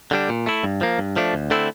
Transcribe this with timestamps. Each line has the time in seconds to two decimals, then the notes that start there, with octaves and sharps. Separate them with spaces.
0.11 D3 G3 D4
0.29 A#2
0.46 A3 E4
0.64 G2
0.81 F3 A#3
0.98 G2
1.16 F3 A3 D4
1.34 D2
1.50 D3 A3 C4 E4